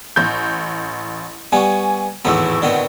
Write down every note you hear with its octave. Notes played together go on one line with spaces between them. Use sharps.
A1 G6
G3 B3 G#5 C#6
G#1 E2 A2 B3 E6
D3 D#3 B3